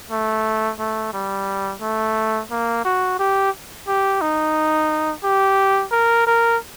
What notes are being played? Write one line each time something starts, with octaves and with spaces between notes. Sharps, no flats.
A3
A3
G3
A3
A#3
F#4
G4
G4
D#4
G4
A#4
A#4